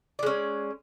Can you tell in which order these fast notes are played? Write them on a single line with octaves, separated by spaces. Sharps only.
D5 G#3 C#4